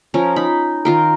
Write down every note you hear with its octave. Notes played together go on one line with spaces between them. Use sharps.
F3 C#4 A#4
D#4 B5
D#3 F4 A#4